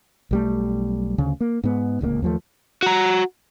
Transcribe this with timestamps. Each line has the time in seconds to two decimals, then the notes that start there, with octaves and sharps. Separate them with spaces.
0.31 B1 G3 A3
1.18 D2 C#3
1.41 A#3
1.63 G#2 B3
2.01 D1 C#2 C3 A#3
2.22 D#2 F3 A3
2.83 F#4 A#5